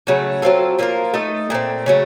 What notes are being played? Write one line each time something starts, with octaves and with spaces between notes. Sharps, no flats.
C#3 F#3 A3
F#3 C4 F4 A4
F3 A#3 F4 A#4
A3 D#4 A4 D#5
A#2 A3 C4
C#3 F#3 A3